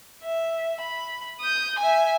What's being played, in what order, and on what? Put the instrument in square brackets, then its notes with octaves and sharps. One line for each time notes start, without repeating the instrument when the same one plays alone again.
[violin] E5
B5
D#6 G6
E5 G#5